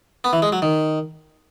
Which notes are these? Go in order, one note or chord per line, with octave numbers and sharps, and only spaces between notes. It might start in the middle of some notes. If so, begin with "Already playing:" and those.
B3
E3
G#3
F#3
D#3